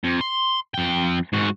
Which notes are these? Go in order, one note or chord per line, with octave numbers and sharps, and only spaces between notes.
F2
C6
F2 G5
G#2 F#4